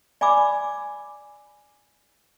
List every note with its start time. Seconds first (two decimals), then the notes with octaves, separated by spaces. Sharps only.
0.21 D5 G#5 B5 D6 E6